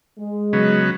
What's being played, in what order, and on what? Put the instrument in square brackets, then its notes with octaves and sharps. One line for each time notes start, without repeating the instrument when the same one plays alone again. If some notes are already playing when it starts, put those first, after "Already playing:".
[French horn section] G#3
[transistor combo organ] C#3 F#3 B3